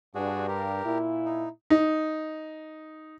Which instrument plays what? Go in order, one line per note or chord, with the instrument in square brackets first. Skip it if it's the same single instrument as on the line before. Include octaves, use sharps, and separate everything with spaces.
[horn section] G2 [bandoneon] D4 F#4 G#4
[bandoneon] G4 A#4
[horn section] A#2 E4
[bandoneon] D#4
[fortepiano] D#4